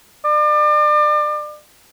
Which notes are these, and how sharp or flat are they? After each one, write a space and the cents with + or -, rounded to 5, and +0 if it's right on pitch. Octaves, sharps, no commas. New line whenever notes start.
D5 +35